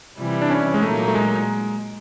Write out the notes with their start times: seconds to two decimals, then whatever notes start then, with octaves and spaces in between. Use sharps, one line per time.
0.17 C3 E3 G3
0.42 D4
0.50 C#4
0.74 G#3
0.82 A#2 F#3 A3 A#3 D#4
1.08 A3
1.15 G#3